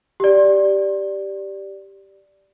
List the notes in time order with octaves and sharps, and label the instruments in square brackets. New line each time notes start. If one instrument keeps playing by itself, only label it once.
[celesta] G4 D5